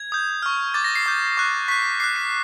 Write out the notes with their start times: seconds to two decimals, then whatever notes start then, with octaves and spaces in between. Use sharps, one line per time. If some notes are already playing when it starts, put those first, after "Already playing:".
Already playing: G#6
0.12 D#6 G6
0.42 C#6 F6
0.74 D6 G6 A6
0.84 A#6
0.95 C7
1.06 D6 G6
1.37 C#6 F#6
1.68 C#6 F#6 B6
2.00 D6 F#6 C7
2.16 B6